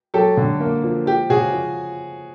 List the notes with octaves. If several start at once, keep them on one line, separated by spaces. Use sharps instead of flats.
F#3 G4 A4
D3
A#3
F3
F3 G4
C#3 F#4 G#4
F3